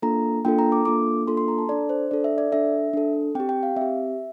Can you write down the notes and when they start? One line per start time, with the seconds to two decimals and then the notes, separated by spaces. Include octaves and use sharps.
0.02 A#3 D4 F4 A4 A#5
0.45 A#3 D4 F4 A4 G5
0.59 A#5
0.72 D6
0.85 A#3 D4 F4 A4 D6
1.27 A#3 D4 F4 A4 C6
1.37 C6
1.48 A#5
1.58 A5
1.69 D4 A4 D5
1.89 C5
2.11 D4 A4 D5
2.24 E5
2.38 D5
2.52 D4 A4 E5
2.93 D4 A4
3.35 C4 G4 G5
3.49 G5
3.63 F5
3.77 C4 G4 E5